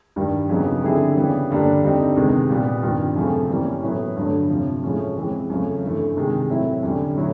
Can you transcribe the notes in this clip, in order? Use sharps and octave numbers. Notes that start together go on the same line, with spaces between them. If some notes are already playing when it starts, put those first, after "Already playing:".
G2 D#3 G3
F2 C#3 F#3 B3 D#4
D3 G3 C4 E4 G#4
C#3 E3 G3 B3
G2 D3 G3 A#3 D4
G2 D3 G3 C4 D#4
C3 D#3 G#3 B3
A#2 G3 B3
G2 D#3 G3 C4 F4
F#2 C#3 F3 A3 C4
E3 G3 A#3 C#4
A2 F#3 B3
G2 D3 F#3 A3
F2 C3 F3
A2 F3 G#3 C#4
E3 G#3 C4
F#2 C#3 F3 A3
G2 E3 A3
C3 D#3 G#3
A2 F#3 A3 C4 E4
F#2 D3 G3
A2 F#3